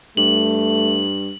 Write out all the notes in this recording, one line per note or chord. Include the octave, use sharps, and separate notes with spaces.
G2 A3 F#7